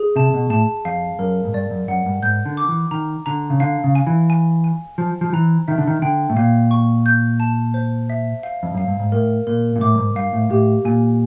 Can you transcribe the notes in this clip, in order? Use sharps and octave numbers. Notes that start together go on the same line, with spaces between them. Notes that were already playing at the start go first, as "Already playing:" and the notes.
Already playing: G#4
C3 A5
B2
A2 A5
F2 F5
F#2 A#4
G#2
G2 D5
F#2
F#2 F#5
G2
G#2 G6
D3
D6
E3
D#3 A#5
D3 A#5
C#3
D3 F5
C#3
G#5
E3
G#5
G#5
F3 C5
F3
E3 A#5
D#3 E5
D3
D#3
D3 G5
A2
A#2 F5
C#6
G6
A5
C5
E5
F5
F2
F#2 F5
G2
G#2
A2 A#4
A#2 A#4
A#2
A2 D6
G2
G#2
G2 F5
A2
A2 G4
A#2 G#5